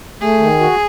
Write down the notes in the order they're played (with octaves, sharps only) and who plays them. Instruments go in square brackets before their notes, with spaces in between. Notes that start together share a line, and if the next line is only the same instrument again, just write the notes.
[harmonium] A3 [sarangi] G#4
[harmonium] D#3
F#4